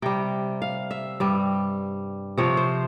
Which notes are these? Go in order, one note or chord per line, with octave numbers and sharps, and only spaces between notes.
C3 G3 G5
F5
E5
G2 G3
C3 F3 C#5
C5